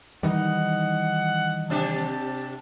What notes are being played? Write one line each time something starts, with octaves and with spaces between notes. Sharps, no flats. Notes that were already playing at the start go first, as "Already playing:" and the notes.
D#3 E3 G3 D#4 F#5
C3 D4 G4 A5